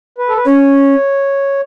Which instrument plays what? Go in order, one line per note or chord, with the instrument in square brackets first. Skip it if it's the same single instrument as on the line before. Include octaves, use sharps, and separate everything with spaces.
[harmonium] B4
A4
B4
[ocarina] C#4 [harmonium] C#5